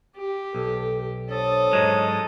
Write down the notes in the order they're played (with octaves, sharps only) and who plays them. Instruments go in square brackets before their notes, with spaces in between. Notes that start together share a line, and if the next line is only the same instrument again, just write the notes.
[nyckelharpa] G4
[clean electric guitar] B1 [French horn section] A4
[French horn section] D4 C5 C#5 [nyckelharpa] A4 D#6
[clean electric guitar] G#2 F#3 G#3